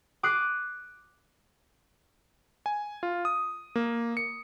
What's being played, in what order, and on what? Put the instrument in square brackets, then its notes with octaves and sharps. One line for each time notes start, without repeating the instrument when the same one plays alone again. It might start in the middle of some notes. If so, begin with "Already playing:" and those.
[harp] D6 D#6 F#6 C7
[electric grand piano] G#5
F4
D#6
A#3
C#7